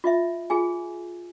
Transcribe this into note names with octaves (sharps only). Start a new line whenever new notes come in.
F4 D#5 E5
F4 G#4 G#5